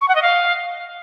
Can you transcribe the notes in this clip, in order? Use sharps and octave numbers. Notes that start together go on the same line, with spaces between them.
C#6
F#5
D#5
F5